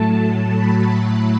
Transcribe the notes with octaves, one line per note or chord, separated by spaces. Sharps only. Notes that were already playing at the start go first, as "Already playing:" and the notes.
Already playing: A2 F#3 A3 A5
B5